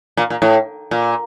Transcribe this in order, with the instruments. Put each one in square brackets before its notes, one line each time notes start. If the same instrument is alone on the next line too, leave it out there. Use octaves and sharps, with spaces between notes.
[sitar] A#2
A#2
A2
A#2